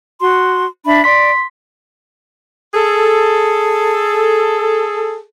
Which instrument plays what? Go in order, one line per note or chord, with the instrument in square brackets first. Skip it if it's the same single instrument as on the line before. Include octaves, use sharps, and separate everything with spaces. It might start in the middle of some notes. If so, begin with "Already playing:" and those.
[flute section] F#4 C6
D4 E5 B5
[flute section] D5 [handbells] C6 B6
[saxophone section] G#4 A4